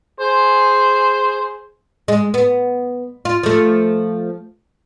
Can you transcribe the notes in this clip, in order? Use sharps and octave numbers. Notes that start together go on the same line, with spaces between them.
G#4 C5
G#3
B3
F4
F3 A3